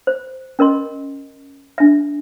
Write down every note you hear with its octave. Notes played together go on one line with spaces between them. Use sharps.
C5
C#4 A#4 D#5 C6
D4 E5